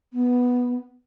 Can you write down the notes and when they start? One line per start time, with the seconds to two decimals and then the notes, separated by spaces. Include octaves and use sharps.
0.12 B3